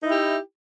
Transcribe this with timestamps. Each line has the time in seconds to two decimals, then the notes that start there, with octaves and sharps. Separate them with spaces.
0.03 D#4
0.05 E4
0.08 G4